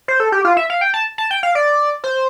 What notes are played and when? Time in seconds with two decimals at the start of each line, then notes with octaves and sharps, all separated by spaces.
0.08 C5
0.20 A4
0.32 G4
0.45 F4
0.57 E5
0.70 F5
0.81 G5
0.94 A5
1.18 A5
1.31 G5
1.43 F5
1.55 D5
2.04 C5